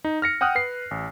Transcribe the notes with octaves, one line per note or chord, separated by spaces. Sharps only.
D#4
F6 A#6 C#7
F#5 G5 D#6 F6 F#6
B4 C7
A1